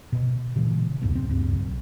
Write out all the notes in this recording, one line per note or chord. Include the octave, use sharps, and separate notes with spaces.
B2
A#2 C#3 E3 G#3
C2 F2 G#2 B2
C4
D2 G2 C#3
B1